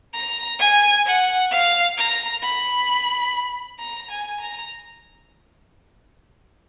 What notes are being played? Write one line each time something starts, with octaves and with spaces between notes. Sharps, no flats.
A#5
G#5
F#5
F5
A#5
B5
A#5
G#5
A#5